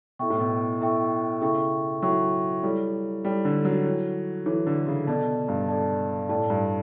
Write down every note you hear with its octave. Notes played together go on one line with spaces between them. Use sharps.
B2 E4 A4 E5 G5 C#6
A2
B2
E4 A4 E5 G5 C#6
C#3 E4 A4 E5 G5 C#6
F#3 E4 A4 E5 G5 C#6
G3 E4 A4 C#5
G3 E4 A4 C#5
D3
F#3
E4 A4 C#5
E3 E4 A4 C#5
D3
C#3
B2 A4 D5 A5
G2
A4 D5 A5
A2 A4 D5 A5
G2